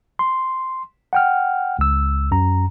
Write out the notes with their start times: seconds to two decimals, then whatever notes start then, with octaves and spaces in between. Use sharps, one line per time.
0.19 C6
1.13 F#5 G5 F6
1.79 C#2 E6
2.32 F#2 A#5